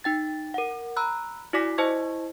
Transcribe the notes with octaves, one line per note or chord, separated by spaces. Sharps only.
D#4 G5 A6
A#4 F#5
A#5 B5 E6 F#6
E4 F#4 D5 G#5 D6 B6
E4 C5 D#5 A5 C#6 G#6